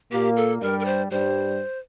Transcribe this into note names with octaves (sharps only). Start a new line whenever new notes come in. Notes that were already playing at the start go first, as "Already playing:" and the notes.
A#2 A#3 G4
A4
G2 G3 A#4
A#4
C5
G2 G3 C5